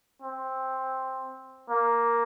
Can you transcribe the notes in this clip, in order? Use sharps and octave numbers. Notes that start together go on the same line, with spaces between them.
C4
A#3